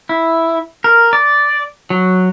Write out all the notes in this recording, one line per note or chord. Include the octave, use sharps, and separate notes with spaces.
E4
A#4
D5
F#3